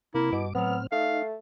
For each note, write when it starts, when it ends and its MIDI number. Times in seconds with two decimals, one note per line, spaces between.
0.14 0.31 48
0.14 0.31 58
0.14 0.40 64
0.32 0.53 43
0.32 0.47 47
0.32 0.53 86
0.55 0.87 45
0.55 0.79 54
0.55 0.77 59
0.55 0.87 60
0.55 0.87 89
0.92 1.35 57
0.92 1.22 63
0.92 1.22 77